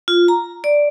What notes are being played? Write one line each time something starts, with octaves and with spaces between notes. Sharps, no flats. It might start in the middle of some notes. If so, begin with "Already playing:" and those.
F4
A#5
D5